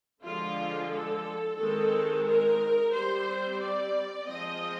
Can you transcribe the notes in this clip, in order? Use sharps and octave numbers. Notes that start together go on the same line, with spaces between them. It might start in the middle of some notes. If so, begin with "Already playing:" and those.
D3 F3 G#3 F4
A4
D#3 G#3 C4 A4
A#4
G3 C4 C5
D5
F3 G#3 C4 D#5